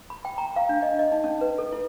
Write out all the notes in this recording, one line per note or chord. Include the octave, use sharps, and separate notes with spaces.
B5
G5
A#5
F5
D4
D#5
D#5
D#4
C#4
B4
A4
E4